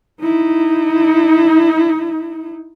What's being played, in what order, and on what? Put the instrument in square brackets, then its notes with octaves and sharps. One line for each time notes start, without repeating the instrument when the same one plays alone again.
[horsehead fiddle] D#4 E4